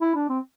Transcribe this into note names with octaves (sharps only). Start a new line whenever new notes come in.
E4
D4
C4